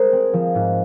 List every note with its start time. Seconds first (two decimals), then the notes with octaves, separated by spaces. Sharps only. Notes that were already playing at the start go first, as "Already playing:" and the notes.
Already playing: G#3 G#4 A#4 C5
0.13 C4
0.33 F3
0.55 G#2